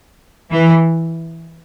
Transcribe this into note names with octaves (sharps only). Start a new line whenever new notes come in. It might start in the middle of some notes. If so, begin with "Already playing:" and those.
E3